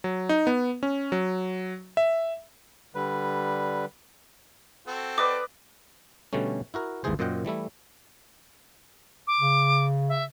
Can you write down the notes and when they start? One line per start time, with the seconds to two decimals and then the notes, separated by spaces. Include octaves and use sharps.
0.04 F#3
0.29 D#4
0.47 B3
0.83 C#4
1.12 F#3
1.97 E5
2.95 D3 G3 B4
4.87 C4 F#4 A4
5.18 B4 D5 D#5 D6
6.33 B2 D3 G3 A3 C#4
6.74 E4 F#4 A#4
7.04 G#1 D#2 G#2 E3 G#4 C5
7.19 F#2 A#2 C5 D#5 F#5 G5
7.45 E3 G3 A3 E4
9.27 D6
9.40 C#3
10.09 E5